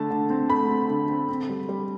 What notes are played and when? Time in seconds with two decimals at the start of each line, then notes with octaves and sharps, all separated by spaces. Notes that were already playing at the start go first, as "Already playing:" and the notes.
Already playing: D3 A3 A5
0.11 D3
0.30 C4
0.49 A3 B5
0.69 C4
0.90 D3
1.09 C4
1.29 C4
1.49 G3
1.69 G3